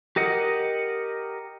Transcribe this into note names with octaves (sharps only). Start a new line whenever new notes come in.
G4 A#4 D#5 F#5